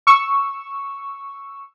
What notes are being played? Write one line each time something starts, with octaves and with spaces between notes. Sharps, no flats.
C#6 E6